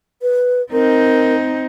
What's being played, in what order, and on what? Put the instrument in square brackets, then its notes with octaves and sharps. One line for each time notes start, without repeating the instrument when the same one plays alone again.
[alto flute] B4
[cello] C4 D#4 [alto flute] A#4